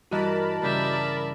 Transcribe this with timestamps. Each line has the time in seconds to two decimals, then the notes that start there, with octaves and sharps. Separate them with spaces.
0.11 G2 E3 F#4 A#4 D#5 A5 B5
0.62 G2 C#3 D5 E5 G5